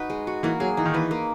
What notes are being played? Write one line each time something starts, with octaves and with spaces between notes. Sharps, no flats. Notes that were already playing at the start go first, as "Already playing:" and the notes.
Already playing: D#4 F#4 B4
G#3
F#4
E3 A#3
F#3 G#4
E3 D#4
D#3
E3 B4
A#3